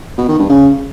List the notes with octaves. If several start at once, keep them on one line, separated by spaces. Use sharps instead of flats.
B2
D#3
G2
C#3